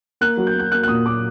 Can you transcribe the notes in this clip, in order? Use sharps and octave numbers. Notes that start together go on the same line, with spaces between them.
A#3 F#6
F#3
G6
A#3
G6
A#3 F#6
F#6
A#2 D#6
A#3 D6